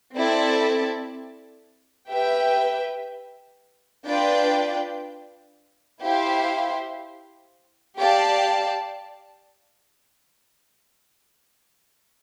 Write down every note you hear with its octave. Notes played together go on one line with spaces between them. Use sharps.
C4 E4 A4 D5 A5
G4 B4 E5 G5
D4 F4 B4 D5 G5
E4 G4 C5 F5
G4 D5 F5 A5